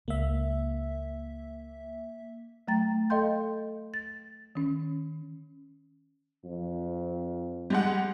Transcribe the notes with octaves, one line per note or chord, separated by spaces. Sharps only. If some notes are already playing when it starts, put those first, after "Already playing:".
C#2 A#3 E5
F#3 A3 G5 A#5 A6
A4 D#5 F5 G5 C6 G6
A6
D#3 C#4
F2
G3 G#3 F#5